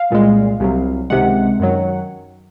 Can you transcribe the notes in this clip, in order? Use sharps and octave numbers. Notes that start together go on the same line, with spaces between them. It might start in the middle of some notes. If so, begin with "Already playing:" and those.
Already playing: F5
C2 A#2 G#3
C2 C3 F#3
C#2 C3 D#3 G#3 F#5
F#2 D#3 F#3